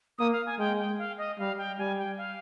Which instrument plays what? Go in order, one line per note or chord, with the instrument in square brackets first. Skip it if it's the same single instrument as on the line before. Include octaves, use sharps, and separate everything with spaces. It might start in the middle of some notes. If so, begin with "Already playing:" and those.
[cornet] A#3 [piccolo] D#6
[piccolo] F5
G#5
[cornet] G#3 [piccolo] G5
[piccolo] G5
F5
D#5
[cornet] G3 [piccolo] F5
[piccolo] G5
[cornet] G3 [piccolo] G#5
[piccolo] G5
F5